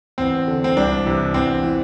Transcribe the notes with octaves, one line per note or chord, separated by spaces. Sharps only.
E2 C4
D3
C4
C2 D4
C3 E3
E2 C4
E3